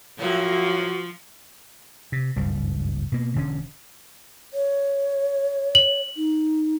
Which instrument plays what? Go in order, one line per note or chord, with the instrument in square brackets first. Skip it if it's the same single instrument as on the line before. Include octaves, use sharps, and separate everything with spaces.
[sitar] A2 F#3 A#3 [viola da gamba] F3 [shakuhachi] F#4
[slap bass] C3
F#1 C#2 G2 G3
B2 A#3
E1 D3 C#4
[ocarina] C#5
[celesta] F#7
[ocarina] D#4